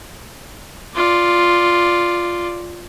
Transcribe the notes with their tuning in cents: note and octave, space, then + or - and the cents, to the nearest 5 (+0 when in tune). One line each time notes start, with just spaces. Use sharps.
F4 +0 D5 +0